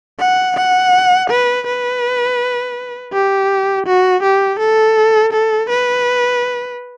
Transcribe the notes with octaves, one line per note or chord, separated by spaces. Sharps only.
F#5
F#5
B4
B4
G4
F#4
G4
A4
A4
B4